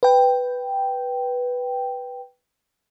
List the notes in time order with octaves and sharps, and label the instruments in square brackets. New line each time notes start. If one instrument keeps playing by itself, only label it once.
[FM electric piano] B4 G5